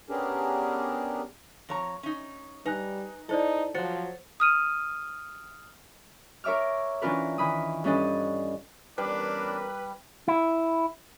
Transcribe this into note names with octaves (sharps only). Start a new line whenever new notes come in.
B3 C#4 D4 G4 G#4 A#4
F2 C#5 A#5
C#4 D#4
G3 D#4 B4 G#5 F#6
D#4 E4 A4 C5 D5
F3 F#3 C5 A6 C#7
D#6 F6 D#7
A#4 C#5 E5 D6 F6
E3 C#4 D4 F4 A#4 B4
D#3 E3 B5 D#6
G2 C#4 D4 A4 D#5
E2 G3 C#4 D4 A#4 B4
E4